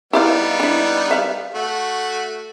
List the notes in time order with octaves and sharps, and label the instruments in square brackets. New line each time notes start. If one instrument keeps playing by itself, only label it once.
[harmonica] G3 B3 D#4 [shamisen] E4 D5 F5
[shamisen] D4 E4
E5 F5
[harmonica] A3 F#4